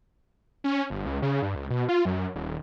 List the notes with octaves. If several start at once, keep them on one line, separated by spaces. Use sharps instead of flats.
C#4
G1
C#2
C#3
G2
C#2
B2
F4
F#2
D#1